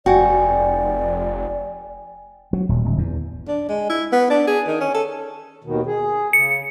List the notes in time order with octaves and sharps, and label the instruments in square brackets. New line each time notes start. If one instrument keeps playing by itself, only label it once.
[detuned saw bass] F1 [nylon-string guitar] F#4 [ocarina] D5 [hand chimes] G5 G#5
[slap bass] F#3
D#1
D1
E2
[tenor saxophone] D4
G#3
E4
B3
D4
G#4
D#3
C#4
A4
[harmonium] D#2 B2 D#3
G#4
[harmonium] C#3 [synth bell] C#7